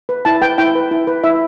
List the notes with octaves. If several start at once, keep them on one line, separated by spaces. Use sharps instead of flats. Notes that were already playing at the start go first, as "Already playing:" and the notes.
B4
E4 A5
B4 G5
E4 G5
B4
E4
B4
E4 E5